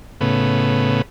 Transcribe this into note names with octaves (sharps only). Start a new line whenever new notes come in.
A2 C#3 B3